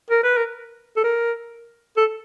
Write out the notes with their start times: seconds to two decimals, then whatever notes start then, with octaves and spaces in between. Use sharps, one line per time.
0.10 A#4
0.24 B4
0.37 A#4
0.97 A4
1.04 A#4
1.97 A4